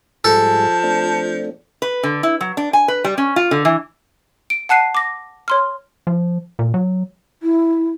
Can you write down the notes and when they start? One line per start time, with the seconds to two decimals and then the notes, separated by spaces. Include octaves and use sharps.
0.24 G#2 F3 G3 G#4 A4 A5
0.83 A3 C4 D4
1.82 B4
2.03 D3
2.23 E4
2.41 F#3
2.57 D4
2.73 G#5
2.88 B4
3.04 G3
3.18 C#4
3.36 F4
3.51 D3
3.65 E3
4.50 D7
4.69 F#5 A5 F#6 C7 D#7
4.95 D6 A#6
5.48 C#5 C6 F6
6.07 F3
6.59 A#2
6.74 F#3
7.42 E4